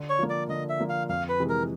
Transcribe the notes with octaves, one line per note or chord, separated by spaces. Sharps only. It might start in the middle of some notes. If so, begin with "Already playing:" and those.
Already playing: D3
C#5
F3 A#3
D5
D3 D#5
E5
F3 A#3
F5
F2 F5
B4
C3 E3 G#3
A#4